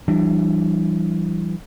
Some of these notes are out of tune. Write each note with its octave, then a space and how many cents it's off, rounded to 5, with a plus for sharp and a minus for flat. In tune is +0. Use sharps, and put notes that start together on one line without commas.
E3 +20 G3 -30 D4 +30